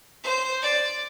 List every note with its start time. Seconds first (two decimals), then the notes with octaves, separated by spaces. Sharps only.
0.24 C5
0.62 D5